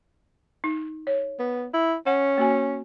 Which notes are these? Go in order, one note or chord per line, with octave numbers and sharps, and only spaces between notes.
D#4
C#5
B3
E4
C#4 F#5
A#3 F#4 G#5